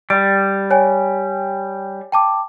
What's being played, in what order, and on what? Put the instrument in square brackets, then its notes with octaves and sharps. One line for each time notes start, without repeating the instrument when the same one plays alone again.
[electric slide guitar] G3 [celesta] D7
[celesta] C#5 G5 G#5
G5 A5 D6